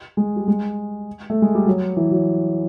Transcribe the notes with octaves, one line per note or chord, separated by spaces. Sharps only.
G#3
G3
G#3
A3
G#3
G3
F#3
E3
F#3